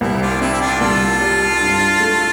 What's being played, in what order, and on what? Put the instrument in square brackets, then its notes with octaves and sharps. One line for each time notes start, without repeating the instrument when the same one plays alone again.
[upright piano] C2 [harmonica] C4 E4
[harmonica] D4 F4
[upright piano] C4 [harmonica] E4 G4
[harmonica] E4
D4 F4
[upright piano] C2 [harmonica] F4 A4
[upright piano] G3
G2
A3